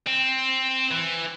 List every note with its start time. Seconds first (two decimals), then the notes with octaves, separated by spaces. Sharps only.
0.07 C4
0.91 E3